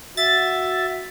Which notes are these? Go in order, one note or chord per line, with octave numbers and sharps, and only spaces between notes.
F#4 E5 A6